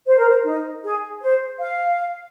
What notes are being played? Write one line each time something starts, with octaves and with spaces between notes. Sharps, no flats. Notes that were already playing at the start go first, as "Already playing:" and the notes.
C5
A#4
C5
D#4
G#4
C5
F5